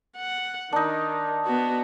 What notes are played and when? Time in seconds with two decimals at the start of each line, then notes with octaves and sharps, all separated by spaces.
0.17 F#5
0.73 D#3 D4 D#4
1.46 B3 F#4